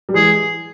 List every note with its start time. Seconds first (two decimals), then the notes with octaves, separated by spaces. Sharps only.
0.09 G3
0.14 E3 G#3 G#4